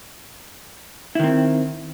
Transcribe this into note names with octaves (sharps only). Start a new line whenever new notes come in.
D#3 C4 E4